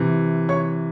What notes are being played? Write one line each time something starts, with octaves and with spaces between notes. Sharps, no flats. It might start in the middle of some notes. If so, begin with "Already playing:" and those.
Already playing: C3 E3
C#5 C#6